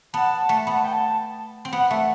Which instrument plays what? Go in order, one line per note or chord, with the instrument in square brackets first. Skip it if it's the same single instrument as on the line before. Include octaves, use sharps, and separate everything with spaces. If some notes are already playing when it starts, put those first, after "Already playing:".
[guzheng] B3 [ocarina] A5
[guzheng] A3
[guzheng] B3 [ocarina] B5
[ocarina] A5
G5
A5
[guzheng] C4
[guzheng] B3 [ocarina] F#5
[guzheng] A3 [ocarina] E5